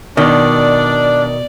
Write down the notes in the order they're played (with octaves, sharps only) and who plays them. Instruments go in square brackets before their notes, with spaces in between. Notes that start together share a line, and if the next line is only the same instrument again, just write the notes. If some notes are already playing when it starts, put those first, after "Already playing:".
[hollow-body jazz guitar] B2 [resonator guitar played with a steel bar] D#3 [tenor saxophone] D4 [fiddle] D5